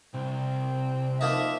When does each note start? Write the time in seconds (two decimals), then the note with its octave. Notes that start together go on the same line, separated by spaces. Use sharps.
0.14 C2 C4
1.21 F3 A#3 D#4 E5